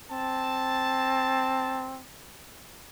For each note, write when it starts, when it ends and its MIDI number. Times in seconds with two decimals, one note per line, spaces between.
0.11 2.06 60
0.11 1.88 81